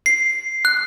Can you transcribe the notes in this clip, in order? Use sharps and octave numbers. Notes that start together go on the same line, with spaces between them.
C7
F#6